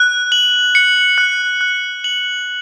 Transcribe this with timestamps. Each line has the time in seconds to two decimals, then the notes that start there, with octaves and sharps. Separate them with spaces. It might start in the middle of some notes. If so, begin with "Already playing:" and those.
Already playing: F#6
0.32 F#7
0.75 C#7
1.18 F#6
1.61 F#6
2.04 F#7